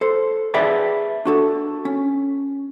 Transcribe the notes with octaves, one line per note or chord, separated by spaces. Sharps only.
A4 C5
G#4 B4 D5 E5 G5 A5
D4 F#4 A4
C#4